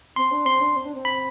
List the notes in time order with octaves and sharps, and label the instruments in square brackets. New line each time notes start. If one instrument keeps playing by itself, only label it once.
[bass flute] C4 [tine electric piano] C6
[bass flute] D4
[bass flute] C4 [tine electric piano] C6
[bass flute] D4
C4
D4
C4
[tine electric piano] B5